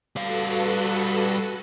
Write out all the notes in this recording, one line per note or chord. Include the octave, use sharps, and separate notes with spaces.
G3 F#4 A4 B4 F5